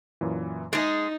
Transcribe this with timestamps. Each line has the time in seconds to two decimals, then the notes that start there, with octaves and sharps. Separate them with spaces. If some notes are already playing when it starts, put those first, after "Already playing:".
0.21 F#2 A#2 E3
0.73 G#3 D#4 G#4 A6